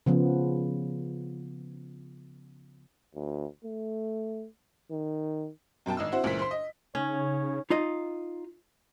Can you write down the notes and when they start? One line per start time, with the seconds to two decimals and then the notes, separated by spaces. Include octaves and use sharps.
0.06 C#3 F3 B3
3.15 D2
3.65 A3
4.91 D#3
5.86 F#2 B2 G5 A5
5.97 G#1 D#5 E6
6.12 C4 E4 F#4 C5
6.24 C#2 A#2 E3 C5 B6
6.39 C5 C6
6.51 D#5
6.95 C#3 C#4 D#4 C#5
7.70 D#4 F4 D#5